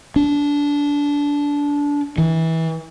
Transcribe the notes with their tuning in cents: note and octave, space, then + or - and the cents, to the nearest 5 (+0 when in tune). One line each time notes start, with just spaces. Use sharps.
D4 -20
E3 -25